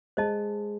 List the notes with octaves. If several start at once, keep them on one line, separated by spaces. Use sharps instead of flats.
G#3 C5 D#5 A5